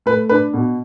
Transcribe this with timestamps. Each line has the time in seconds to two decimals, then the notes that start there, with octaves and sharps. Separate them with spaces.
0.06 A3 B4
0.29 D4 B4
0.54 B2